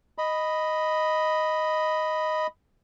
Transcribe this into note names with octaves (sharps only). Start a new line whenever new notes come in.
D#5 B5